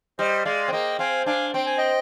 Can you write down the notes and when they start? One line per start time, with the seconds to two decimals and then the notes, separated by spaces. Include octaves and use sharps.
0.19 G3 C5 D#5
0.45 G#3 D5 F5
0.68 C4
0.73 A#3 D#5 G5
0.99 C4 F5 G#5
1.26 D4 F5 G#5
1.54 C4 G5
1.66 G#5
1.78 D#5 G5